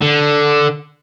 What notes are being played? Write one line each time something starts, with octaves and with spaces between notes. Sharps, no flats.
D3